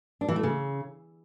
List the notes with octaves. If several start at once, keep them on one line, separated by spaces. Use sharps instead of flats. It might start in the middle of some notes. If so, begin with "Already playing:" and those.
D4
E3
A3
C#3